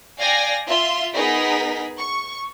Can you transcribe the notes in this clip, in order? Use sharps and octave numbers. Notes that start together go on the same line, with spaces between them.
D5 F5 G5 G#5 A#6
F4 E5 C6
B3 D#4 G#4 A#4 B6
C#6